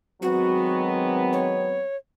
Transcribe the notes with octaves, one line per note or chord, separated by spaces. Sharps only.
D#3 F#3 G#3 B3 C4 F#4
C#5